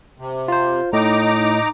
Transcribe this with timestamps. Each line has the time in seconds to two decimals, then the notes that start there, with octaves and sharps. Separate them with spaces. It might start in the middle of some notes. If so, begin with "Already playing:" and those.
0.18 C3
0.48 F4 C5
0.93 A2 D#4 A#5 D6